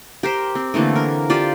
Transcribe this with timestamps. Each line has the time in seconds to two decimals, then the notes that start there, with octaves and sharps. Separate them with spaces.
0.23 G4 A#4 C5
0.55 C4
0.74 D3 E3 A3 A#3
0.95 A#4
1.30 F4 G4 C5 D5